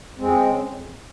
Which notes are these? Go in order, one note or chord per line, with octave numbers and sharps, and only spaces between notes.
F2 G#3 C4
C#3
F2